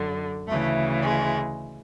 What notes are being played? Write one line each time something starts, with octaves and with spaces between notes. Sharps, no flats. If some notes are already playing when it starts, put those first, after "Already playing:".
Already playing: F#2 D3
D2 C#3 E3 A3
G#3